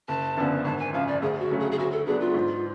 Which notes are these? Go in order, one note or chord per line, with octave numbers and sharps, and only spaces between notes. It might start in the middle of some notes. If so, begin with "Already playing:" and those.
F#1 A5
F#2 D3 F3 B3
G#1 A5
G#5
F#2 C#3 F3 F5
D5
D2 G#4
F#4
C#3 F#3 A3 C#4
G#4
G#4
D2 F#4
A4
D3 F#3 B3 D4 G#4
F4
G#2